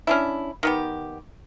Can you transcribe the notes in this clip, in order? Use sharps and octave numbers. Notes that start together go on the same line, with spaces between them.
C#4 D4 E4
D#3 B3 G4